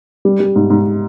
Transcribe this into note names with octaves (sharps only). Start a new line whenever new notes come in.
G3
G3
G#2
G#2